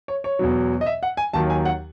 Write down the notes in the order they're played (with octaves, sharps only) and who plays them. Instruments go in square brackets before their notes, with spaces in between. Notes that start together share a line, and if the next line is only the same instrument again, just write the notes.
[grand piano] C#5
C#5
E2 B2 F#3
D#5
E5
F#5
G#5
D#2 D#3 F#3 A5
G#5
F#5